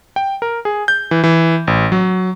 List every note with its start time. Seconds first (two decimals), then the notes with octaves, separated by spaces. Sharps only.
0.16 G5
0.42 A#4
0.65 G#4
0.88 G6
1.11 E3
1.24 E3
1.67 A1
1.92 F#3